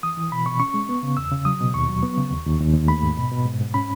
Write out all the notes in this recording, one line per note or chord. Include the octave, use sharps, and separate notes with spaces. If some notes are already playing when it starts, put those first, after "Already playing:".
E3 D#6
E3
B2 B5
B2 C#6
C#4 C#6
G#3
B3
C#3
E2 E6
C#3
F#3 D#6
B2
D#2 C#6
F#3
B3
C#3
D#2
D#2
D#2
D#2
A3 B5
G#2
B2
B2
G#2
G#2
C#4 B5